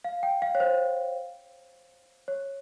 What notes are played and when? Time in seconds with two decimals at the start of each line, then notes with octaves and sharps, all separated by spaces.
0.05 F5
0.23 G5
0.42 F5
0.55 C#5
0.60 C5
2.28 C#5